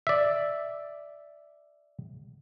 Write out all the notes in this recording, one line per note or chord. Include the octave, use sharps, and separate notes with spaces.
D5 E5